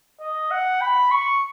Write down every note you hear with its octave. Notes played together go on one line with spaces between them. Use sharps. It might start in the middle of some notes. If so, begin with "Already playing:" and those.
D#5
F#5
B5
C#6